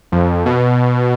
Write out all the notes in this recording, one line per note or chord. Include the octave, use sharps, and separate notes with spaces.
F2
B2